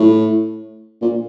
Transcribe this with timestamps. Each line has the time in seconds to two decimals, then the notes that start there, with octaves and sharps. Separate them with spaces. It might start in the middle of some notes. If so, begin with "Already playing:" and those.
Already playing: A2
1.02 A#2